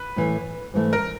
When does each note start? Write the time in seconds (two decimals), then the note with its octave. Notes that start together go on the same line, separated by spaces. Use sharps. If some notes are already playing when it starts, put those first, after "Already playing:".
Already playing: B4
0.16 A2 E3 A3
0.74 G#2 E3 A3
0.93 A#4